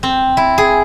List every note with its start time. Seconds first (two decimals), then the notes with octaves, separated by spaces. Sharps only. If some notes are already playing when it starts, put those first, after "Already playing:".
0.03 C4
0.37 E4
0.58 G#4